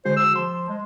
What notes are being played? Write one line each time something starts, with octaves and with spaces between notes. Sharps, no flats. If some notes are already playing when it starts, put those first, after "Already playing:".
D3 G#3 F#4 C5
E6
F3 C6
G#3